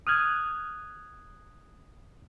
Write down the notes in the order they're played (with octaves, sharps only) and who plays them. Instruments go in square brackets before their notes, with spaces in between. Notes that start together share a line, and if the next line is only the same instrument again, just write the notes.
[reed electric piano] D#6 F6 F#6 G#6